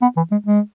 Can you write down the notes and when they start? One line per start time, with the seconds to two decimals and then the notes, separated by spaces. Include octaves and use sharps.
0.02 B3
0.17 E3
0.32 G#3
0.47 G#3